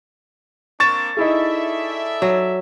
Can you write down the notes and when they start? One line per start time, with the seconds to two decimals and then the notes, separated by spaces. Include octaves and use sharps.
0.80 A#3 C4 D4 C#6 A6 E7
1.17 D#4 E4 G#4 A4 D5 E5
2.22 F#3